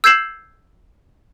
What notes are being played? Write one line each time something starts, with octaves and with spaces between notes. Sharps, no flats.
E6 G6 G#6 C7 E7 F#7